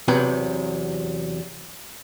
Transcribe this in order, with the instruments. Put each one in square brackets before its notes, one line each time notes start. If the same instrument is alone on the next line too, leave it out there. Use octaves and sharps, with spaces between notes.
[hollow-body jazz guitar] E2 C3 F#3 B4 G5